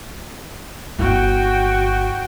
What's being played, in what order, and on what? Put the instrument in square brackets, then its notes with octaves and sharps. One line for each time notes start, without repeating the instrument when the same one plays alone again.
[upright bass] G1 [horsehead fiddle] F#4 G5